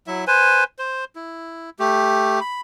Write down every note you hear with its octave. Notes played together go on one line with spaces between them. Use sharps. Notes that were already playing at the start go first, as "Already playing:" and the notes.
F#3 E4 E5
B4 C5 G#5
C5
E4
A3 G4
B5